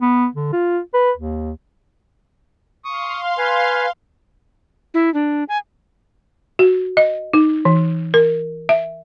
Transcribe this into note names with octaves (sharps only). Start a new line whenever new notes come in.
B3
D3
F4
B4
D#2
F5 C6 C#6 D#6
B4 G#5
E4
D4
G#5
F#4
D#5
D#4
E3
A#4
E5